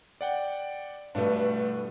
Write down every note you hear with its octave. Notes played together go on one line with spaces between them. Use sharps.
D5 F#5 G5
G2 B2 E3 A3 D4